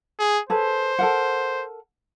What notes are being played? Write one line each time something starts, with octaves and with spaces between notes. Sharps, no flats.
G#4
G#4 A4 B4 C5
A4 A#4 F#5